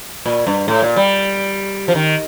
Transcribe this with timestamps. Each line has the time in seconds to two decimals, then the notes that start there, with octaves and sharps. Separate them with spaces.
0.26 A#2
0.47 G2
0.68 A2
0.82 A#2
0.96 G3
1.88 F3
1.95 D#3